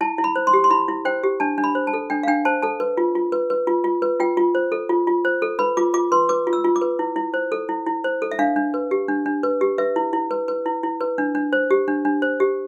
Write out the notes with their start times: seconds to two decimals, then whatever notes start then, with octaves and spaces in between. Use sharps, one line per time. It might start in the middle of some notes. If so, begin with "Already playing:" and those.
0.01 E4 A5
0.18 E4
0.24 B5
0.36 C5
0.47 C6
0.53 G4
0.64 C6
0.70 E4 B5
0.88 E4
1.05 C5 G5
1.23 G4
1.40 D4 A5
1.58 D4
1.64 B5
1.75 C5
1.87 A5
1.93 A4
2.10 D4 G5
2.23 F5
2.27 D4 G5
2.45 C5 A5
2.62 A4 A5
2.80 B4
2.97 F4
3.15 F4
3.32 B4
3.50 B4
3.67 F4
3.84 F4
4.02 B4
4.20 F4 G5
4.37 F4
4.55 C5
4.72 A4
4.89 F4
5.07 F4
5.25 C5
5.42 A4
5.59 B4 B5
5.77 F4 D6
5.94 F4 D6
6.12 B4 C6
6.29 B4 D6
6.47 F4
6.53 E6
6.64 F4
6.76 D6
6.81 B4
6.99 E4
7.16 E4
7.34 C5
7.52 A4
7.69 E4
7.86 E4
8.04 C5
8.22 A4
8.31 E5
8.39 D4 F5
8.56 D4
8.74 B4
8.91 G4
9.08 D4
9.26 D4
9.43 B4
9.61 G4
9.78 B4 E5
9.96 E4
10.13 E4
10.31 B4
10.48 B4
10.66 E4
10.83 E4
11.01 B4
11.18 D4
11.35 D4
11.53 C5
11.71 G4
11.88 D4
12.05 D4
12.22 C5
12.40 G4